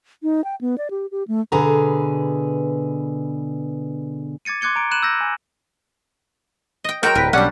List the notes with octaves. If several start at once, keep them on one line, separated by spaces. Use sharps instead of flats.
D#4
G5
B3
D5
G4
G4
A3
B2 D3 G#4 B4 A#5
D6 G#6 A6 C#7 D#7
C6 D6 F#6 G#6 C#7 G7
A#5 D7
B5 F#6 D#7 E7 F#7
E6 G6 A#6
G#5
D#5 G5
F#3 G#3 F#4 A#4 G5
D1 C2 A#4 B4
B1 G3 C#4 D4 F#5